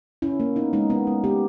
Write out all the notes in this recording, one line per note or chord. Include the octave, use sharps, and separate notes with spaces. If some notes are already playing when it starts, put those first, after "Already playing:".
C#4 E4
A#3
B3 D#4
G#3 D#4
B3
G#3
B3 G4